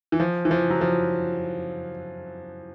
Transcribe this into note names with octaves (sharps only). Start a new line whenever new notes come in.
E3
F3
E3
F3
F#3
F3